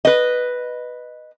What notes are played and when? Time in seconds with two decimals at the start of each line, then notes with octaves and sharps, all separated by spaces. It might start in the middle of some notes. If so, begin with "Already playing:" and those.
0.05 B4 D#5